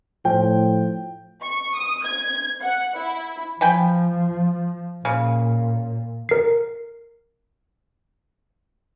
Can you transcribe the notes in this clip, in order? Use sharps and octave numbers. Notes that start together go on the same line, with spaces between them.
A2 F3 G5
C#6
D#6
G#6
F#5
E4
F3 G5 G#5 B5
A#2 C#3
A#4 C7